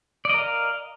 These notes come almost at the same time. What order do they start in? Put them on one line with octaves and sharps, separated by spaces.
D5 D#5 A#4 F5